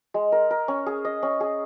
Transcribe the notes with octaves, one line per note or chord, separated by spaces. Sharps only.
G#3
A#4
A#4
C#4
G#4
D#5
C#4
G#4